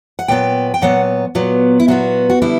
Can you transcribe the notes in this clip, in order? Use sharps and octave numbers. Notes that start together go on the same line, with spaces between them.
F#5
A#2 F#3 B3 G5
G5
A#2 F#3 B3 F#5
A#2 F#3 B3
E4
A#2 F#3 B3 F#4
F#4
D3 G3 B3 E4